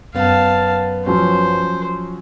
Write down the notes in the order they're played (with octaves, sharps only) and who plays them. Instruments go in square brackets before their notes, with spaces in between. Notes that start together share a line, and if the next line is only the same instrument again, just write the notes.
[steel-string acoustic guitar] F#2 B3 [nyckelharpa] F5 A5
[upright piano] F3 F#3 C#4 [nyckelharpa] C5